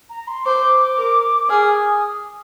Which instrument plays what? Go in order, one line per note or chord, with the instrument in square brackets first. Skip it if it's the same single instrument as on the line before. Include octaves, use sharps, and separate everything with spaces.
[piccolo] A#5
C6
[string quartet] C5 [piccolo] D6
[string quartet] A#4
[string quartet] G#4 [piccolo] F6
[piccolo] D#6